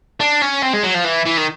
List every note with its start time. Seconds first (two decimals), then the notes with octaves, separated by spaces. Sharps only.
0.21 D4
0.42 C#4
0.62 C4
0.73 G#3
0.83 F#3
0.94 F3
1.04 E3
1.26 E3
1.37 D#3